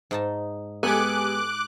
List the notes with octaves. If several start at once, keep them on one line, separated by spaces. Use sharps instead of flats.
G#2 D#4 A5
G#3 B3 G4 A4 G#5 D6 F#6